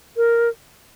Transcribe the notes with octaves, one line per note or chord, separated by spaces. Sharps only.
A#4